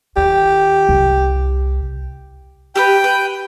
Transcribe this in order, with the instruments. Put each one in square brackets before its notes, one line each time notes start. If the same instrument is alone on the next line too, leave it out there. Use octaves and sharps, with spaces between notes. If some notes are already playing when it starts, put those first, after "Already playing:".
[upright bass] D#2 [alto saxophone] G4
[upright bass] C2
[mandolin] G4 A4 B4 [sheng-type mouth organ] G5
[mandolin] B4